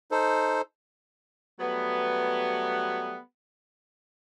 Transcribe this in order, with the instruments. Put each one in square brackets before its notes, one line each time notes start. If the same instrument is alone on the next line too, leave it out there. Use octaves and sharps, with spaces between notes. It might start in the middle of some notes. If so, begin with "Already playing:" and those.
[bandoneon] D#4 A4 C5
[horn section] F#3 G3 A3 B3